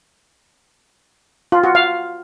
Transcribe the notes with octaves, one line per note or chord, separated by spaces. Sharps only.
F4
F#4
F5